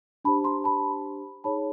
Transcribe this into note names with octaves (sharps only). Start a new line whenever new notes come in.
D4 G4 C5 A5 B5
A#5 C6
A5 B5
D#4 G#4 C#5 A5 B5